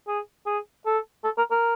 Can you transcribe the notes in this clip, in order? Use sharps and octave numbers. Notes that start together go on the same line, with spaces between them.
G#4
G#4
A4
A4
A#4
A#4